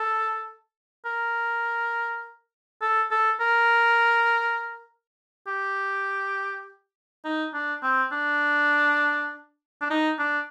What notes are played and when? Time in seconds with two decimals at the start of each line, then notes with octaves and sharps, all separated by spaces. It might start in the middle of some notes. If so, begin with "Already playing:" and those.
Already playing: A4
1.05 A#4
2.81 A4
3.11 A4
3.40 A#4
5.47 G4
7.24 D#4
7.53 D4
7.83 C4
8.12 D4
9.81 D4
9.90 D#4
10.19 D4